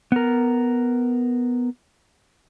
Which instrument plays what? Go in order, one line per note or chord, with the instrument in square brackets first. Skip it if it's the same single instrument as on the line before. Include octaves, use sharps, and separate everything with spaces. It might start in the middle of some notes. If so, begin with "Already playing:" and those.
[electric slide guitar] B3 A#4